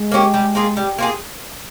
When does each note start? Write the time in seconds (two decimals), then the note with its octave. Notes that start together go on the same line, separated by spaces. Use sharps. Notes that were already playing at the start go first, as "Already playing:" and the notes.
Already playing: G#3
0.12 A#3 C#4 G4
0.34 G3
0.55 A#3 F4 G#4
0.77 G3
0.98 A#3 F4 G#4